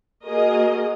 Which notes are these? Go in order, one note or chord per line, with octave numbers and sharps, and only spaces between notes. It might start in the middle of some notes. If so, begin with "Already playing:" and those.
A#3 F#4 G#4 A#4 D#5